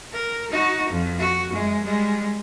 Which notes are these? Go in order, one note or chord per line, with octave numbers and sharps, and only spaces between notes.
A#4
D#4 F#4
F2
F#4
F#2 G#3
G3 G#3